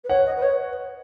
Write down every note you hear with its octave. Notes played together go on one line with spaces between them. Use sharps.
B4
C#5 F#5
D#5
B4
C#5